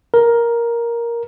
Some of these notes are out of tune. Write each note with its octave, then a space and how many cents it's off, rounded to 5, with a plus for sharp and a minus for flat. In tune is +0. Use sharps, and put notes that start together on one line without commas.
A#4 +10